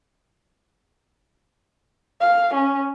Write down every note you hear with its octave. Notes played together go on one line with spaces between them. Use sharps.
F5
C#4